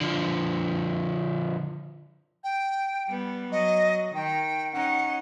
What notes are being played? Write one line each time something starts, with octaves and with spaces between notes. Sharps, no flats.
D3 F3
G5
G3 B3
F#3 D#5
D#3 G5
C#4 D#4 F#5